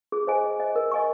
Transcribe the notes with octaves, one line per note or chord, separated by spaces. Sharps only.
G#4
C5 D#5 G#5
G#4
C5 D#5 G#5
A#4
D#5 G#5 C#6